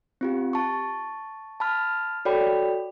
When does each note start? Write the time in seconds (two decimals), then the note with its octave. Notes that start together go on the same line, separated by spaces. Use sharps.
0.21 C4 F4 G4
0.53 A5 C#6
1.60 A5 B5 F6
2.25 F#4 A4 C#5 D5 G5 B5